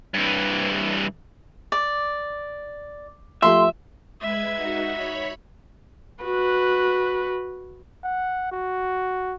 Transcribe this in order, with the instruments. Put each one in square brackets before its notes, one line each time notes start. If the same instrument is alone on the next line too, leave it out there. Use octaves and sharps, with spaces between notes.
[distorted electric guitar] G2 E3
[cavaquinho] D5
[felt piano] F3 A3 G4 [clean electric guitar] E5 [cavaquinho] C6
[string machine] G#3 B4 G#6 [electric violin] E5
[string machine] D#4 F#4
C#5 B5
[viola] F#4 B4
[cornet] F#5
F#4